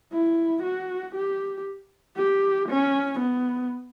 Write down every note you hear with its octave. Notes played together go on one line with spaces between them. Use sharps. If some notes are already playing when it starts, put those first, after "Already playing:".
E4
F#4
G4
G4
C#4
B3